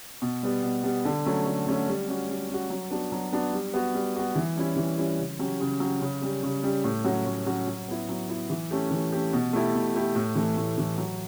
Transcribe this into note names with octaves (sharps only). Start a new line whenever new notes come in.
B2
G3 B3
B2
G3 B3
D3
F#3 A3 C#4
D3
F#3 A3 C#4
G3
C#4 F#4
G3
C#4 F#4
F#3
B3 D4 F#4
F#3
B3 D4 F#4
G3
B3 F#4
G3
B3 F#4
E3
G3 C#4 E4
E3
G3 C#4 E4
C#3
F#3 C#4 G4
C#3
F#3 C#4 G4
C#3
G3 C#4 G4
C#3
G3 C#4 G4
A2
F#3 C#4 F#4
A2
F#3 C#4 F#4
F#3
B3 E4
F#3
B3 E4
E3
A3 C#4 G4
E3
A3 C#4 G4
B2
A3 E4 G4
B2
A3 E4 G4
A2
E3 A3
A2
E3 A3
F#3